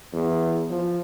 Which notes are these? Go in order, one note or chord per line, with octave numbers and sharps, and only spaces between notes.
E2
F3